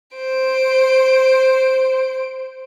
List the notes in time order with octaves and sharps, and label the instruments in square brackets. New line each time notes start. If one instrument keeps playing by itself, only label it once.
[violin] C5 D7